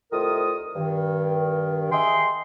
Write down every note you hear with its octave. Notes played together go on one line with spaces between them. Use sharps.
C2 D#3 A3 F4 A#4 D#6
G2 D#3
G#4 D#5 E5 G5 C6